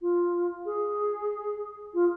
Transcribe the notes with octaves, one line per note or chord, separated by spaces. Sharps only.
F4
G#4
F4